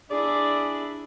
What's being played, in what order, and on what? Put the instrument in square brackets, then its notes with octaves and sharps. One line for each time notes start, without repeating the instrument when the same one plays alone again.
[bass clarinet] D4 [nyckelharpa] E4 G#4 [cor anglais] D5